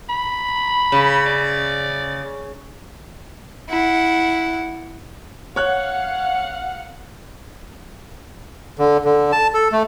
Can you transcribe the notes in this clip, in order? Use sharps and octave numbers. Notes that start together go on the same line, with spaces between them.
B5
C#3
D5
E4 F#5
C#5 F5 F#5 F#6
D3
D3
A5
A4
A3